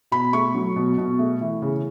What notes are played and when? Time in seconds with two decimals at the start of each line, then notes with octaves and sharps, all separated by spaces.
0.11 B2 B5
0.33 A3 C#6
0.55 F#3
0.76 B2
0.98 B2
1.19 A3
1.41 E3
1.62 C#3